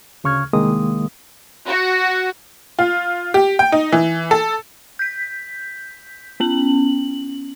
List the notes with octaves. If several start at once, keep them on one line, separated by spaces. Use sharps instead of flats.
D2 C#3 C#6 F6 G#6
C2 D#3 G#3 A#3 D#6
F#4
F4
G4
G5
D#4
E3
A4
G6 B6
B3 C#4 F#7